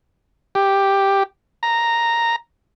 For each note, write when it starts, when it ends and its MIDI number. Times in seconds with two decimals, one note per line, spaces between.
0.55 1.23 67
1.63 2.36 82